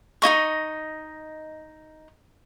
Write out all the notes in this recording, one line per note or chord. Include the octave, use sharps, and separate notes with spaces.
D#4 E4 D#5 C#6